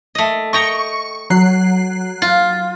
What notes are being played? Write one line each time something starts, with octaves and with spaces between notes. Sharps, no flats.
A3 D#5
D#5 G5 A#5 C#6 C#7
F#3 F#6 C7
F4